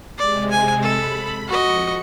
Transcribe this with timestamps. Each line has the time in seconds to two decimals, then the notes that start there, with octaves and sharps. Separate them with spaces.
0.18 C3 G#3 D5
0.51 G#5
0.82 A4 B5
1.48 F2 F#4 D#5 C#7